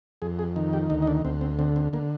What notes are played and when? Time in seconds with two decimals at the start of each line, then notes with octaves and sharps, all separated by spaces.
0.22 F2 G#4
0.39 G#4
0.56 D#3
0.73 G4
0.90 D2 D#4
1.02 D#4
1.07 D4
1.25 D2 C4
1.41 C4
1.59 D3 C4
1.76 C4
1.93 D3 A#3